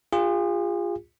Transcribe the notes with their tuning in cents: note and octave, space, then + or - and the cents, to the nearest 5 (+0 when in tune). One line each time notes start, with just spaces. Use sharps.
F4 +0 G#4 -40